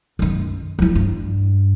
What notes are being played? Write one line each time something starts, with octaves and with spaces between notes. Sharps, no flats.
F#2 D#3
F3 E4
G2